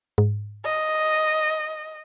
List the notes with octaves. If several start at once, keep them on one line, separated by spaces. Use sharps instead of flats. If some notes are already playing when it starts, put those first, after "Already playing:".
G#2
D#5